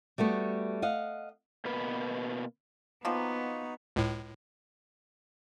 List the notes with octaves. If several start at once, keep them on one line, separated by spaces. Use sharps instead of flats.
G3 A3 B3 F#4
D#5 F5 F#5
B2 A#3 B4
D#3 F3 A#3 B3 D#4 F#4
C#2 A2